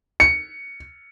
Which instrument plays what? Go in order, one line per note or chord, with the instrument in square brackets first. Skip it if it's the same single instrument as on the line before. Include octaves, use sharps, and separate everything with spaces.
[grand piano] C#7